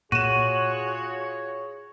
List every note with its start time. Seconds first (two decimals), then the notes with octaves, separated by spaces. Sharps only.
0.12 A#2 F4 F#4 G#4 C#5 D#7 E7